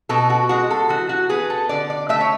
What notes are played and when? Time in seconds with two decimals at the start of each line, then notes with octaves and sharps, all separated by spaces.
0.09 B2 A4
0.30 F#4
0.49 G#3 F#4
0.70 A4
0.89 E3 F#4
1.09 F#4
1.29 B3 G#4
1.50 A4
1.69 D3 D5
1.90 D5
2.09 A3 E5
2.21 C#5